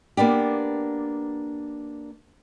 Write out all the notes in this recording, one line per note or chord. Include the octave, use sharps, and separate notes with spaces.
A#3 B3 D4 G4